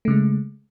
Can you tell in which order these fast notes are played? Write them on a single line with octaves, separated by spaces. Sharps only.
A3 C#3 G#3